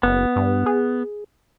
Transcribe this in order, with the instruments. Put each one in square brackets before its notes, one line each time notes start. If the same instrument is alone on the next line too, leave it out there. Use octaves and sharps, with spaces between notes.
[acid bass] F#1 [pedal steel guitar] B3
[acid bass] G2
G#4